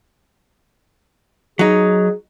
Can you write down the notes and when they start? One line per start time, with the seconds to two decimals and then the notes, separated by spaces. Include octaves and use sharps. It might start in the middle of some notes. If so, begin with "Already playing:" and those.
1.59 F#3 D#4 G#4